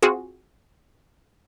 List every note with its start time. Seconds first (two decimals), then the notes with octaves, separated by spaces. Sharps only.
0.02 C4 F4 F#4 G#4